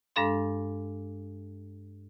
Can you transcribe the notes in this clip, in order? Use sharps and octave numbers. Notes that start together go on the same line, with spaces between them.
G2 G#3 D4 A4 F5 C6